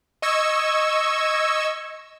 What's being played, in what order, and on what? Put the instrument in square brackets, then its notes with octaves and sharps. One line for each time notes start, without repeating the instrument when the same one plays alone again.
[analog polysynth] D#5 C#6 E6 G#6